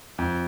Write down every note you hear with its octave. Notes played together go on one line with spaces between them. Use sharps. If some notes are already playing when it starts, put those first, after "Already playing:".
F2